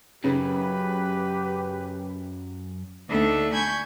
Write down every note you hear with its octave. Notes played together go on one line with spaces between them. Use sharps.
F#2 C#3 G4 B4
D2 A3 D4 D#4 A4 E5
G#5 B5 C#6 G6 G#6